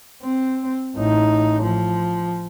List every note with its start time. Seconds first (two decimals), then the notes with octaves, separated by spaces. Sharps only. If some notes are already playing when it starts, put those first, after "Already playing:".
0.23 C4
0.96 A1 D#4
1.63 F3